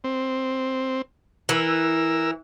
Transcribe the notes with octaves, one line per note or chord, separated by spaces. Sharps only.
C4
E3 A#4 E6